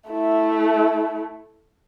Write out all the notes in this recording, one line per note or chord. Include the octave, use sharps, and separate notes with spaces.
A3 E4